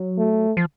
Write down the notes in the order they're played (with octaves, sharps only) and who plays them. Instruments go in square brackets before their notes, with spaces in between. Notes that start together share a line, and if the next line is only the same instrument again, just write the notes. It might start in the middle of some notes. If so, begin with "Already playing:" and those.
Already playing: [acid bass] F#3
[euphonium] A3
[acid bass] F3